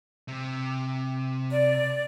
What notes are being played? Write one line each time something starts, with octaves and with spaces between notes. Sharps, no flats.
C3
D5